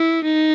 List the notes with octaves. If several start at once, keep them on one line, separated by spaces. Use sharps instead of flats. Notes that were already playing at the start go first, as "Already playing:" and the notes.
Already playing: E4
D#4